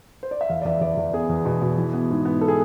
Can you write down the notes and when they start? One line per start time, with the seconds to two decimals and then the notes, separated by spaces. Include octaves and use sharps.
0.23 C5
0.31 D5
0.41 E5
0.49 E2 F5
0.62 D5
0.65 E2 E5
0.81 E2 D5
0.97 E2
1.13 B3 G#4
1.29 E2
1.46 B2
1.62 B2
1.78 E3
1.93 B3
2.10 G#2
2.25 B3
2.41 A4
2.48 G#4